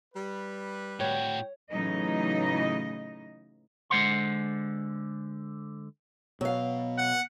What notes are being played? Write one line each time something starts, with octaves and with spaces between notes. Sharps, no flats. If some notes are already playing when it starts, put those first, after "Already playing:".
G3 B4
A2 F#4 C#5 G5
A2 C#3 E3 F#3 D#4 D#5
D3 G#3 C5 F#5 C6
B2 F#3 F5
F#5